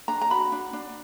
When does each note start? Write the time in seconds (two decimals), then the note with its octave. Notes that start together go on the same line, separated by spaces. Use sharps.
0.08 D4 A#5
0.21 A#5
0.30 F#4 B5
0.52 D4
0.73 D4